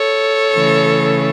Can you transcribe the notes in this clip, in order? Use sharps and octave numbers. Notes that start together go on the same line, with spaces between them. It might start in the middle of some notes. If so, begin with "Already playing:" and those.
Already playing: A4 C#5
C#3 E3 A3